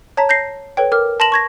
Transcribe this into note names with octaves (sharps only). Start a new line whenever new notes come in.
C#5 A5 A#5 B6
G6 A#6 C7
A4 B4 C#5 G5
A#4 D6 F6
A5 C6 A#6 E7 F#7
C#6 G#6 A#6